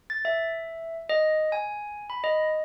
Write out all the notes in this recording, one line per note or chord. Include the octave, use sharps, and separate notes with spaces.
A6
E5
D#5
G#5
B5
D#5